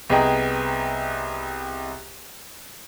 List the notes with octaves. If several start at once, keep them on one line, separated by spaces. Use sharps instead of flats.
C2 B3 G#4 D#5 G5 A#5